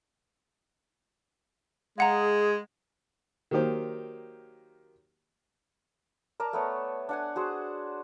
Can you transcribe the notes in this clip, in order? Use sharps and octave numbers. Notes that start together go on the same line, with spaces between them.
G#3 G#4 F5 F#5 A#5
D#3 F#3 A#3 G4 C5
A#4 D5 A5 A#5
A3 B3 C#5
D4 F#5 G#5
F#4 G#4 C5